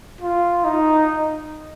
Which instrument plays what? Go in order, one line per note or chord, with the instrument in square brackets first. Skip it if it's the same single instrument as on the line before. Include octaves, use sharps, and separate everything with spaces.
[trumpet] F4
D#4